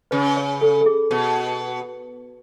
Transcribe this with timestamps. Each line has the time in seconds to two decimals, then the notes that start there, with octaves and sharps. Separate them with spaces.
0.11 C#3 B4
0.37 C#5
0.61 A4
0.81 A4
0.86 G#4
1.11 B2